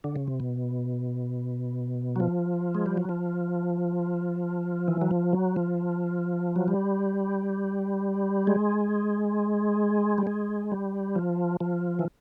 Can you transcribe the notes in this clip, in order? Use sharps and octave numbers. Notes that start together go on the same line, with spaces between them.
D3
C#3
C3
B2
F#3
F3
G#3
G3
F#3
F3
E3
F#3
F3
F#3
F3
F#3
G3
G#3
G3
G#3
G3
F3
F3
E3